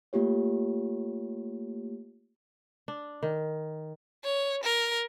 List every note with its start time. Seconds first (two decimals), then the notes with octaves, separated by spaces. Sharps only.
0.13 A3 A#3 F4 G4 C#5
2.88 D4
3.23 D#3
4.24 C#5
4.64 A#4